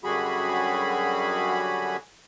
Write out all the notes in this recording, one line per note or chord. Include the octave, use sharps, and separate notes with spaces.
F#2 D3 G3 F#4 G#4 B5